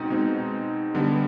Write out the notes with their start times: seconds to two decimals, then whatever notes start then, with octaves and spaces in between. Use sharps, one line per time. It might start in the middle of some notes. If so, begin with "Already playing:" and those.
Already playing: B2 G#3 C4 D#4
0.10 B2 G#3 C4 D#4
0.95 D3 G3 B3